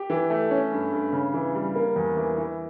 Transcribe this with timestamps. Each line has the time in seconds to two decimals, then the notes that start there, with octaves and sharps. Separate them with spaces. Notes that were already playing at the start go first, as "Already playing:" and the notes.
Already playing: G4
0.10 E3
0.30 A3
0.51 C#4
0.71 G2
0.93 G2
1.13 C#3
1.34 E3
1.55 G3
1.76 A#3
1.96 E2
2.17 E3
2.38 E3